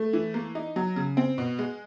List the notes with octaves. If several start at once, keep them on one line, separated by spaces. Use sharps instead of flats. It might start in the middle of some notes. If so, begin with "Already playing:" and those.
Already playing: A3
E3
A#3
D#4
F#3
C#3
C4
B2
G#3